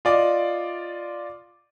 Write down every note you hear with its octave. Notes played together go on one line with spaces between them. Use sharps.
F4 D5 D#5 D6